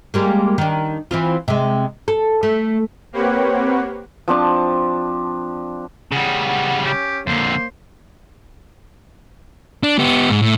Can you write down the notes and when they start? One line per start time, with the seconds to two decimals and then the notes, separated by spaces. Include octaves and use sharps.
0.14 G3 G#3 A#3
0.58 D#3 D4
1.11 E3 C4 F4
1.48 C3 G#3
2.08 A4
2.43 A3
3.13 A#3 C4 G4 B4 C#5 F#5
4.28 F3 C4 D4 A5
6.12 C#3 G3 F#5
6.44 F#5
6.85 C#4 G4
7.27 F2 D3 A#3 C5
9.83 D4
9.99 B3 G4
10.30 G#2
10.42 A2